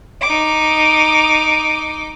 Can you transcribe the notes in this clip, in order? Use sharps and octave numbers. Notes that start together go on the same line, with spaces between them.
D#4 D6